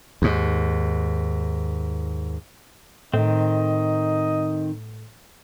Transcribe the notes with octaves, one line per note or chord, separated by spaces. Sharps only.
D#2 G#2
A2 D#3 C4 D#5